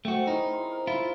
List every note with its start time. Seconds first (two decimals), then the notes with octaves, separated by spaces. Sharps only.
0.05 A3 C4 C#4 F#4 G5
0.27 D#4 E4 G#4 A#4
0.53 F3 C6
0.71 A#4
0.87 E4 F4